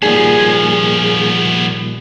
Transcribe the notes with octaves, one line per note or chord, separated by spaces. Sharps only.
A#2 D#3 F3 G3 B3 G#4